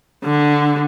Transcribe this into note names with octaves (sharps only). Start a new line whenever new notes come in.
D3